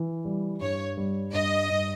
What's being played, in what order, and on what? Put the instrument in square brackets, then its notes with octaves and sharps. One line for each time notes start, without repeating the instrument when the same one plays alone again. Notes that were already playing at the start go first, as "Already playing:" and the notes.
Already playing: [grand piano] E3
G3
[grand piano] G2 [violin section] C#5
[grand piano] G3
[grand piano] G2 [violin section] D#5
[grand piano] G2